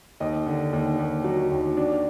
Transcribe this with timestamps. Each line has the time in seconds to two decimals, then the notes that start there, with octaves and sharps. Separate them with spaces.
0.20 D#2 D#5
0.46 D3
0.73 D#2
0.99 D#2
1.24 F#3
1.52 D#2
1.77 D4